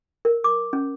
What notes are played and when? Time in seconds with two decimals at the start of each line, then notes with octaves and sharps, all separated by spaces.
0.25 A#4
0.44 D6
0.73 C#4